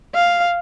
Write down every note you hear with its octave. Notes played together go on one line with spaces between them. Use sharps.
F5